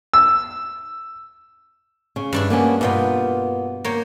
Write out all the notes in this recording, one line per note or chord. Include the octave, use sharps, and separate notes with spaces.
E6
C#3
G2 D4 E4
A#3 B3 C#4
G2 B2 A#3 B3 F4 G5
A#3 C#5 G5